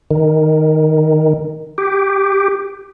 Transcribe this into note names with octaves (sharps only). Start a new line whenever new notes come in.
D#3
G4